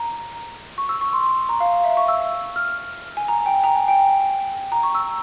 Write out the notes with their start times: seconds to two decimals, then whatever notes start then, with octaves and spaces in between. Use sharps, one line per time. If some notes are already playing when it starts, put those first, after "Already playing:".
Already playing: A#5
0.78 C#6
0.89 E6
1.01 C#6
1.13 C6
1.49 A#5
1.60 F5
1.73 F5
1.84 E5
1.97 C#6
2.08 E6
2.56 F6
3.17 G#5
3.28 A#5
3.46 G5
3.64 A#5
3.76 G#5
3.88 G5
4.72 A#5
4.83 C#6
4.95 E6